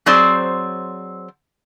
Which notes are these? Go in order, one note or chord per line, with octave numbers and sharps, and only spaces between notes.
F#3 C4 G#4 C5 D5